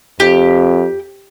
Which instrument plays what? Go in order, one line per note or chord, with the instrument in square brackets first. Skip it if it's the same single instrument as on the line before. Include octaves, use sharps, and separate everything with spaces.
[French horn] F2 [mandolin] G4